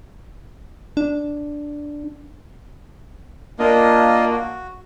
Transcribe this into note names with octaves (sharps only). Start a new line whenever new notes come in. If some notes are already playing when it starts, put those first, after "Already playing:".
D4
A#3 D4 F4 D#5
F#4